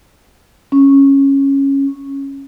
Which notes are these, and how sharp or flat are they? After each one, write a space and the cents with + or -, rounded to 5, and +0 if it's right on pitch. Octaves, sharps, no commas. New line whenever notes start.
C#4 -10